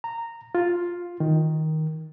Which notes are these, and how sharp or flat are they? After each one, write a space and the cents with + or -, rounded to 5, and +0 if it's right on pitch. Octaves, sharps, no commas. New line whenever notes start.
A#5 -15
F4 +5
D#3 +10